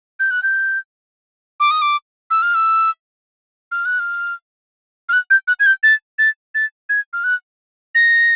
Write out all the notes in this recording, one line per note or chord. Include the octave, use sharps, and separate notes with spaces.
G6
F#6
G6
D6
D#6
D6
E6
F6
E6
F6
F#6
F6
F6
F#6
G6
F#6
G#6
G6
A6
A6
A6
G#6
F6
F#6
A#6